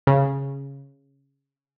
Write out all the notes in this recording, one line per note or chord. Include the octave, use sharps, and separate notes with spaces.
C#3